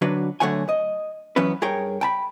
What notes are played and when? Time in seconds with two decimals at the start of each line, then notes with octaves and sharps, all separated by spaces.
0.02 D3 F#3 D4 F#4 B4
0.40 D3 F#3 A3 C#5 F#5 G#5
0.69 D#5
1.36 F#2 E3 F#3 B3 C#4 B4
1.62 G2 G#4 A#4 C#5 G5
2.01 G5 A5 B5